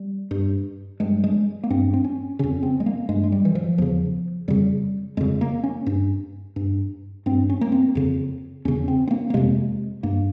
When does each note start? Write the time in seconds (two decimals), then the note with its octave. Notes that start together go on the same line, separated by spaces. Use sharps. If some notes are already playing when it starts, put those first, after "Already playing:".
Already playing: G3
0.31 G2
1.00 G2 G#3
1.24 G#3
1.64 A#3
1.70 G2 C4
1.94 C4
2.04 C#4
2.39 F2 C#3 C#4
2.63 C4
2.80 G#3
2.86 A#3
3.09 G2 G#3
3.24 G#3
3.32 G3
3.45 E3
3.55 F3
3.78 E2 C#3 F3
4.48 F2 C#3 G3
5.17 F2 C#3 G#3
5.41 A#3
5.64 C#4
5.86 G2
6.56 G2
7.26 G2 C4
7.50 C#4
7.61 A#3
7.72 C4
7.95 F2 C#3
8.65 E2 C#3 C#4
8.88 C4
9.08 C4
9.11 A#3
9.30 A#3
9.34 F2 C3 G#3
10.03 G2 A#3